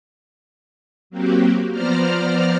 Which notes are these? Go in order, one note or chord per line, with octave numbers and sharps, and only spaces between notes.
F#3 A#3 C4 F#4 G4
F3 B3 C5 D5 A#5 F6